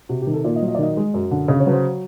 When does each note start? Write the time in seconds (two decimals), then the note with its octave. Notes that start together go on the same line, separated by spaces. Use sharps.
0.09 C3 F#4
0.22 G4
0.27 D#3
0.33 A4
0.44 A#2 D5
0.56 D#5
0.62 F#3
0.68 D#5
0.75 D5
0.79 D#3 D#5
0.97 G#3
1.14 F#2
1.31 D3
1.48 C#3
1.60 C#5
1.66 F#3 B4
1.73 C5